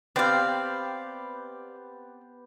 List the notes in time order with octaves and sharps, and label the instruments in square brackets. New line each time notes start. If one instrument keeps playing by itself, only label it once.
[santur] B3 G4 [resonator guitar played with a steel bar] C4 [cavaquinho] D5 F5